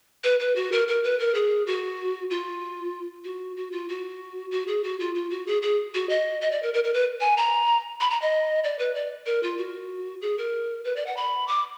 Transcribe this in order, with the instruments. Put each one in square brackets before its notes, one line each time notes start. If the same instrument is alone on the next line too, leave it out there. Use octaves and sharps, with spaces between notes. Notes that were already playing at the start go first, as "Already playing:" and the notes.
[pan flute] B4
B4
F#4
A#4
A#4
B4
A#4
G#4
F#4
F4
F#4
F#4
F4
F#4
F#4
G#4
F#4
F4
F4
F#4
G#4
G#4
F#4
D#5
D#5
D5
A#4
A#4
A#4
B4
G#5
A#5
B5
A#5
D#5
D5
B4
D5
A#4
F4
F#4
G#4
A#4
B4
D5
F#5
B5
D6